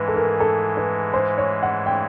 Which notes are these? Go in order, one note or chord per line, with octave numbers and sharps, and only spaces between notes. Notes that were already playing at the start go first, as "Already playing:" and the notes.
Already playing: G#2 E3 G#3 B4
A4
A#4
A4
B4
C5
C#5
F#5
G5